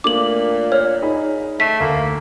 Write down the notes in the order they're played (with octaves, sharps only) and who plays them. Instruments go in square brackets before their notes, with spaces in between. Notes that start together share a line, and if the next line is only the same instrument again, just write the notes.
[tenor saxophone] A#2 [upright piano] A3 A#3 D4 [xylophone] D6 F#7
[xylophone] C#5 [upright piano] F6
[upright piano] D#4 G#4 B5
[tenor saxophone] A3 [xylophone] B6 [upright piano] C7 D#7 E7
[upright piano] D2 [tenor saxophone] A#3